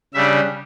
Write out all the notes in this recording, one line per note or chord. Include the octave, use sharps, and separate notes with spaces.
C#3 G3 D4 E5